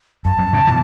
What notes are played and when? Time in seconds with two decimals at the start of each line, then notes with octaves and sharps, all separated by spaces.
0.25 F#2 A5
0.39 F#2
0.53 A2 C#3
0.67 B2 E3